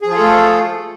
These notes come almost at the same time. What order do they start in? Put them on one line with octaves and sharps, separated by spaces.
G#4 F3 F4 A4 A3